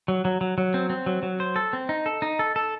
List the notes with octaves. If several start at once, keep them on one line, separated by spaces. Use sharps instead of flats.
F#3
F#3
F#3
F#3
C4
C4
F#3
F#3
C5
A4
C4
D#4
A4
D#4
A4
A4